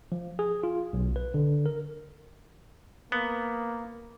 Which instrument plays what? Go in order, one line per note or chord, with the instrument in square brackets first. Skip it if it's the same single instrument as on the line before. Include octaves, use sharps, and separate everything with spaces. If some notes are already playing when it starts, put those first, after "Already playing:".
[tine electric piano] F3
G#4
F4
B1
B4
D3
A#4
[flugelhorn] A#3 [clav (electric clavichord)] B3